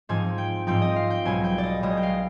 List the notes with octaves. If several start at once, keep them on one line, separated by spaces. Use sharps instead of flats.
G#2 F3 C4 D#4 G#5
G5
G#2 F3 C4 D#4 G5
D#5
F5
G5
B1 B2 G#3 G#5
G5
D5
D#5
B1 B2 G#3 D#5
G5
F5